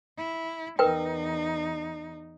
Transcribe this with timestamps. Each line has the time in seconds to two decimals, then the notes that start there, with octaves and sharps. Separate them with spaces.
0.18 E4
0.79 E2 D#4 A#4 B4 G5